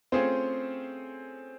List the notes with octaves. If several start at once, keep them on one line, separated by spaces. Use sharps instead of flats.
A3 C4 C#4 F4 G#4 C5